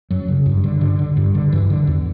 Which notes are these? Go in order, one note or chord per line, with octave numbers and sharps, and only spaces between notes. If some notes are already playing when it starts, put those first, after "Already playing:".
F#2 F#3
C#3
G2
D3
G2 D3
D3
G2
D3
G2 E3
D3
E2